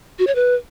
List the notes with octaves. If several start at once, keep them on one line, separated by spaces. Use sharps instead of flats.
F#4
C#5
B4